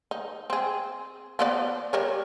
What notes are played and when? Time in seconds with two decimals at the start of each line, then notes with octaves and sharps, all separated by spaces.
0.11 D#4
0.50 C4 G#4
1.39 F3 B3 D5
1.93 G3 A#4 C#5